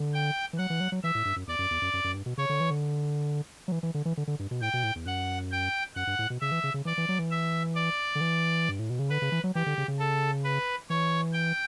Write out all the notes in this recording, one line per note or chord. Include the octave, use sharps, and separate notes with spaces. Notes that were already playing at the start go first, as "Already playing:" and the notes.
Already playing: D3
G5
E3
F#3 F#5
E3
F#3
F#3
E3 E5
A2
G2
F#2
E2 D5
F#2
E2
F#2
F#2
F#2
G2
B2
C#3 C#5
D3
E3
D3
F#3
E3
E3
D3
E3
D3
D3
G2
B2
A2 G5
B2
A2
E2
F#2 F#5
G5
F#2 F#5
G2
A2
B2
C#3 E5
E3
C#3
C#3
E3 D5
E3
F#3
E3
E5
D5
D3
E3
G2
A2
B2
C#3
D3 B4
C#3
E3
F#3
E3 G4
D3
C#3
C#3
A4
B4
E3 C#5
G5